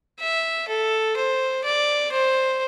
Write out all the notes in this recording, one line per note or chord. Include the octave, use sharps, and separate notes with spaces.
E5
A4
C5
D5
C5